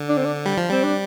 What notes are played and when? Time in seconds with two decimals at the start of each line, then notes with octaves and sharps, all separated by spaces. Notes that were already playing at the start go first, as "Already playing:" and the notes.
Already playing: D3
0.09 D4
0.17 C4
0.25 D4
0.46 G3
0.57 F3
0.69 G3 C4
0.83 D4